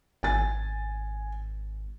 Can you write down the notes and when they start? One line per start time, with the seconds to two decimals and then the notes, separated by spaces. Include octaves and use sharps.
0.23 G#1 G#5 A6